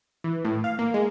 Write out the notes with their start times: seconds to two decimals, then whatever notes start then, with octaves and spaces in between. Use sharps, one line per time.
0.24 E3
0.45 A2
0.64 F5
0.79 A#3
0.94 G#3